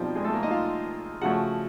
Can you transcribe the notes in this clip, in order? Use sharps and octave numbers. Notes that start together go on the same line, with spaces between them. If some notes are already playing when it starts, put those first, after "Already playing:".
Already playing: B2 F3 G3 C4 D#4 F4
G#3 G#4
A3 A4
A#3 A#4
D#4 D#5
F4 F5
C#3 F3 A3 C#4 F#4 F#5